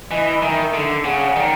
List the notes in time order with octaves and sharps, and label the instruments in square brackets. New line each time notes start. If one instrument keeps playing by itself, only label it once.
[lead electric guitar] E3 [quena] D#5
[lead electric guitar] D#3 [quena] E5
[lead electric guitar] D3
[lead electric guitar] C#3 [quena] F#5
[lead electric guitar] D#3 [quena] D5